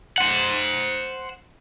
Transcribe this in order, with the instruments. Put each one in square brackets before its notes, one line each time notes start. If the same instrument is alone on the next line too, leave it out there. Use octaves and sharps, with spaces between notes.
[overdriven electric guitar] C5 F#5